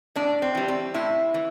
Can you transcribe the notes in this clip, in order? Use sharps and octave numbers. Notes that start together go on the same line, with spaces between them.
A2 D4
C4
E3 G3
C4
A2 E4
E3